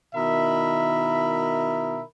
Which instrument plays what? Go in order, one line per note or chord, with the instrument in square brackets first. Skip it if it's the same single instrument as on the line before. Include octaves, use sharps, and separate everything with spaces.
[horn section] B2 D#3 E4 A#4 E5 B5